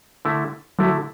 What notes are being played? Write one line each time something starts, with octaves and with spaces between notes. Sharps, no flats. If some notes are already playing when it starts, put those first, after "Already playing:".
D3 A3 E4
D3 F#3 A3 E4